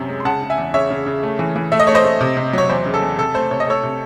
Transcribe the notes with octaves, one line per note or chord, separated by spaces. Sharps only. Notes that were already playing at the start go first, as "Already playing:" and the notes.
Already playing: F#2 C3 C#4
G#3
C6
C#3 F#5 A5
C#3
E5 G#5
E2
C#3 C#5 E5
C#3
C#3
A3
E3
E3
A3 E5
D#5
A3 C#5
C5 D#5
A3
C3
C3
F#3 C#5
E2 C5
C#3
A4
E2
C3 A4
A3 C5
C3 C#5
D#5
A3 A4 C#5
C3